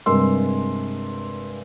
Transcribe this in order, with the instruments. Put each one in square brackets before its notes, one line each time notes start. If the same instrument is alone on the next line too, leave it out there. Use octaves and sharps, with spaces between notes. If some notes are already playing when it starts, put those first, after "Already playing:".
[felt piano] G2 C3 G#3 A#4 C6 E6